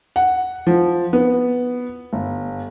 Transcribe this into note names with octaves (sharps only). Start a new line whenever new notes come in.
F#5
F3
B3
G1